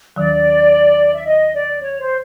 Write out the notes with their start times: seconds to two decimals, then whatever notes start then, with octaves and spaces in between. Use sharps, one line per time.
0.16 D#2 D#3 F#3 D5
1.15 E5
1.26 D#5
1.54 D5
1.82 C#5
1.99 C5